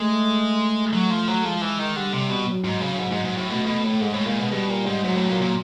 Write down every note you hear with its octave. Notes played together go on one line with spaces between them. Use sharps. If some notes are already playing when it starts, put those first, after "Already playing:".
Already playing: G#3 A3
F#3
F3
F#3
F3 G#3
E3
D#3
D3 G3
C3
B2
F#3
G#2
C#3
G#2
G#2
G#2
A2
B2 A3
B2
A2
G#2 G#3
A2
A#2
B2
B2 G3
A#2
G#2
G#2 F#3
A2
A#2
A#2